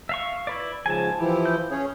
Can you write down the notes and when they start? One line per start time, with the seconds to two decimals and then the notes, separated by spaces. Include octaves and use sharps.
0.09 E5 F5 C#6
0.47 E4 B4 D5
0.86 G#2 C#3 F3 G#5 A5
1.20 E3 F3 E4 G4
1.46 G6
1.71 C#4 G#4 C#5